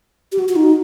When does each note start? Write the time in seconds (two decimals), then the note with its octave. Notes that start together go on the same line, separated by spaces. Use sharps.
0.32 G4
0.39 F#4
0.49 F#4
0.56 D#4